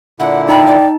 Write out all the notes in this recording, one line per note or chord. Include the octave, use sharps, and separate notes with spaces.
A#2 D3 E4 F#5
D#4 G5 A5 B5
D5